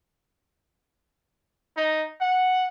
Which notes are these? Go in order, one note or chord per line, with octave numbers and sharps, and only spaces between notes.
D#4
F#5